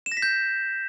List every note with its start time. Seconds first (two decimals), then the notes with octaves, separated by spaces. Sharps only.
0.06 E7
0.12 A#6
0.17 B6
0.22 G6